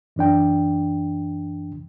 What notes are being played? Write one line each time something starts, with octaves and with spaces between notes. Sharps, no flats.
F#2 E3 D4 G5